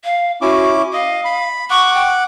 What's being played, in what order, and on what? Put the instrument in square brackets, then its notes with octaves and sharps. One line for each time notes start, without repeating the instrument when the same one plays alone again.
[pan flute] F5
[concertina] C#4 E4 D6 [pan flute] F#4
[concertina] D#5 [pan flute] F5
[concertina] B5
[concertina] F#5 D6 [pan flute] C#6
[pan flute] G5